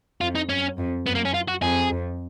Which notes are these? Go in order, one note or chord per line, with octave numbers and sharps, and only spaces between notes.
F2 F4
D#4
F#2 C#4
F2
F#2 B3
A#3
C#4
F4
F#4
F2 G#4
F2